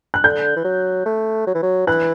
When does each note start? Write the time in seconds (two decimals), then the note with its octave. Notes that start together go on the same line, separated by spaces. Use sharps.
0.14 F#6
0.24 D3 G6
0.56 E3
0.64 F#3
1.06 A3
1.47 F#3
1.54 E3
1.63 F#3
1.87 E3 F#6